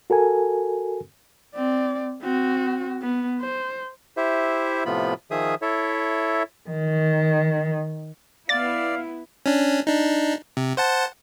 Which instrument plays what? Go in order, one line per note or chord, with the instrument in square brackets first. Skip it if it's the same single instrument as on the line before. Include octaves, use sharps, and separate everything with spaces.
[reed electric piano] F#4 A4 A#4 G#5
[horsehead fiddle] C4 D5
C4 F#4
B3
C5
[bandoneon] E4 G4 C5 E5
A2 C3 F3 B3 F4 B5
D#3 F3 G#4 E5 D#6
E4 A4 C#5 E5
[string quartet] D#3
[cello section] B3 E4 [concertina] D5 [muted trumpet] F5 [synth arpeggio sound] A6
[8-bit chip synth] C#4 D4
D4 D#4
C3
C5 F#5 A5